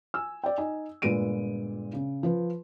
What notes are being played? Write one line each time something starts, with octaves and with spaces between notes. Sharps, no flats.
G#5 E6
D5 G5
D#4 D#5 G#5
G1 A#2 G#3 B4 D7 D#7
C#3
F3 B4